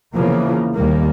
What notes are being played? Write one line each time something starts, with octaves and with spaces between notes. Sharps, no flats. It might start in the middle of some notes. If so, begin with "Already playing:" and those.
E2 C#3 E3 F3 A#3
D#2 G3 A#3